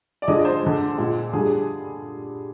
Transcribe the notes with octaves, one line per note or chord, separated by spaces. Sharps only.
D5
D3 F3 G#3 D#5
C5
D3 G#3
A#2 G#3
D3 G3 G#4